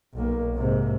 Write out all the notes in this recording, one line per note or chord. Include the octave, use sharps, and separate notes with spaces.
B1 A#3
G#2 C3